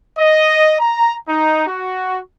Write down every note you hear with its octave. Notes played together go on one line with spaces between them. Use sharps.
D#5
A#5
D#4
F#4